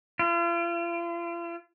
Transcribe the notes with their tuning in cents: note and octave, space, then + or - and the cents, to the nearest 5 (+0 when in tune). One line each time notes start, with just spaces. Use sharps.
F4 -40